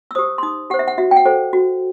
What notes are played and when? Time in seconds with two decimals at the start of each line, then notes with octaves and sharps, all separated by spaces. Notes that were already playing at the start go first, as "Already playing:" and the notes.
0.11 E6
0.15 G4 C5 D#6
0.38 C6
0.43 D#4 D#6
0.70 G4 C5 F#5
0.79 E5
0.88 F#5
0.98 F#4 E5
1.11 G5
1.16 F#5
1.25 A4 C5
1.53 F#4